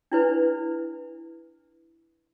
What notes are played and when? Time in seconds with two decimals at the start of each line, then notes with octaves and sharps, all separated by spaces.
0.12 D4 E4 B4